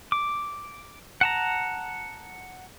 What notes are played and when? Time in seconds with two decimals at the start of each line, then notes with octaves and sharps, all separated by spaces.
0.12 D6
1.21 F#5 A5 A#5